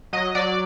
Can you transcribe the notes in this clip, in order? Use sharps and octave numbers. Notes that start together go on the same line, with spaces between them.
F#3 D#5
F#3 D5